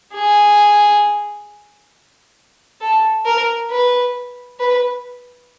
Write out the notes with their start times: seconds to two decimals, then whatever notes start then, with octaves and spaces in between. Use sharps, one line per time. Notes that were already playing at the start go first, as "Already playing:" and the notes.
0.14 G#4
2.81 A4
3.25 A#4
3.71 B4
4.59 B4